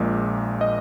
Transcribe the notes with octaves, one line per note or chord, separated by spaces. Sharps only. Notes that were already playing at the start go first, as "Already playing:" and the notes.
Already playing: A#1 A#2 G#3
D#5